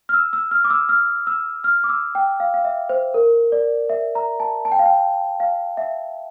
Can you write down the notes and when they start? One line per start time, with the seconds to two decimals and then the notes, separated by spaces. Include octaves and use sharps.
0.09 F6
0.14 E6
0.33 E6
0.51 F6
0.65 D6
0.70 E6
0.89 F6
1.27 E6
1.64 F6
1.84 D6
1.89 E6
2.15 G5
2.40 F5
2.54 F5
2.65 E5
2.89 C5
3.14 A#4
3.52 D5
3.89 E5
4.15 A#5
4.40 A5
4.65 A5
4.72 G5
4.79 F5
4.86 G5
5.40 F5
5.77 E5